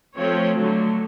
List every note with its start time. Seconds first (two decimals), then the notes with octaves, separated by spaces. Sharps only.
0.16 F3 A3 C4 C#5
0.57 D3 F#3 A3